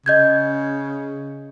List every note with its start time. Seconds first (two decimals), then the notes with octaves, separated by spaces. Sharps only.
0.06 C#3 D#5 G6 G#6